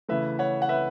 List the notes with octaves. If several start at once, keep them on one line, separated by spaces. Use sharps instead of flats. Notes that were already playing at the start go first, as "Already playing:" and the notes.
C#3 E3 A3 B4 E5
C#5 F#5
F#5
B4 E5